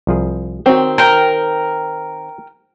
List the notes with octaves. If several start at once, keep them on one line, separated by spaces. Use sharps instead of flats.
C2 F3 G#4
D#3 C4 F#4 C#5
A#4 G5